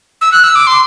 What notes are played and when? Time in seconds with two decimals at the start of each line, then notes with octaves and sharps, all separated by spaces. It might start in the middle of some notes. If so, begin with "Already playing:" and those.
0.21 E6
0.32 F#6
0.44 E6
0.55 D6
0.67 C6